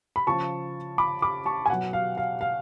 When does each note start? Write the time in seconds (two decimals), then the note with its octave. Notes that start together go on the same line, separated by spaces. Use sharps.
0.16 B5
0.27 C#3 F3 A5 C#6
0.98 B5 D6
1.22 B5 D6
1.46 A5 C#6
1.66 G#5
1.69 B2 F#3 F#5
1.93 F5
2.17 F5
2.41 F5